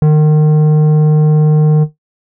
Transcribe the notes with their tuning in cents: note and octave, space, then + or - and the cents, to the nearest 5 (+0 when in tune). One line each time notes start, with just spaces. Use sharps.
D#3 -30